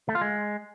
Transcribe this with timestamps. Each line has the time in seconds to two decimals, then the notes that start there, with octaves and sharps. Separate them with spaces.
0.09 A3
0.15 F4
0.21 G#3